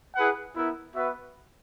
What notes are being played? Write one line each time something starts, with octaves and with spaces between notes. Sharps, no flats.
E4 G#4 B4 F#5
B3 E4 A#4 E5
B3 F#4 B4 E5